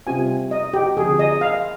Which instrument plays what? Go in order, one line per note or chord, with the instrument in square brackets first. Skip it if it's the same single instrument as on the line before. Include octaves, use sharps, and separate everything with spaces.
[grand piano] C3 G3 C4 F4 [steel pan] G#5
[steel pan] D#5
G4
[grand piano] D3 F3 C4 F4 [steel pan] G#4
[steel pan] D#5
F5